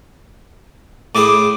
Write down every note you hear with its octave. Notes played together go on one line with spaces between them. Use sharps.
A2 E4 G#4 D6